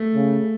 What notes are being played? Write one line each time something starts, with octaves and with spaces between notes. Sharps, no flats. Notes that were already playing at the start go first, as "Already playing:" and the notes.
Already playing: A3
C#3